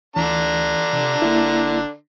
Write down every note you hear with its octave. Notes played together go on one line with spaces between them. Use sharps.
D2 D3 E3 D4 A#5
C3
G1 A#3 E4